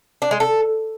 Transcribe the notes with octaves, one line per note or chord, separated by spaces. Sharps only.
D4
G#3
A4